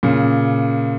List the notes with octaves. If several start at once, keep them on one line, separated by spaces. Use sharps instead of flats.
A#2 C#3